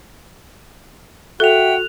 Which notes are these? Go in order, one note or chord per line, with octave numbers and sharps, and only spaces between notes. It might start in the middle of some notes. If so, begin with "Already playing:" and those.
F#4 A4 E5 F#5 G5 F#6 F7